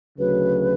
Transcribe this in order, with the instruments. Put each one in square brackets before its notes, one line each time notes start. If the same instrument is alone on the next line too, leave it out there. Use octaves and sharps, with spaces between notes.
[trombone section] D2 C#3 F#3 [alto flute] B4